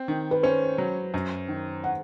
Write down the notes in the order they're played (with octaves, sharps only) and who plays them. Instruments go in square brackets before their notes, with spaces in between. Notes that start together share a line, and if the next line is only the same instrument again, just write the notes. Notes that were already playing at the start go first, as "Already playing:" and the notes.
Already playing: [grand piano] C4
D#3
[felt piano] B4
[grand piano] C#4 [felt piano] C5
[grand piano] F#3
F#2
D#3
[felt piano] F#5